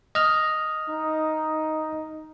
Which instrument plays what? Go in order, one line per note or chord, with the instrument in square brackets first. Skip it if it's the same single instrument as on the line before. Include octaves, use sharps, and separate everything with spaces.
[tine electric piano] D#5 F6
[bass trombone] D#4